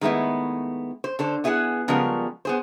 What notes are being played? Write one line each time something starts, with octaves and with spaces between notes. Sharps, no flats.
D#3 G#3 A3 B3 E4
C5
D3 A4 C5
B3 E4 G#4 A4 F#5
C#3 F3 G3 G#3 B3 A#4
B3 G#4 C5